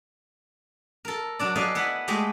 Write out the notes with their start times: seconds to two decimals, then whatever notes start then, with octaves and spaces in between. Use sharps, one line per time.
1.05 A4 A#4
1.39 F#3 D4 D5
1.56 A4 B4 D5 D#5 F5 G#5
1.75 B3 E4 B4
2.08 G#3 A3 G4 D#5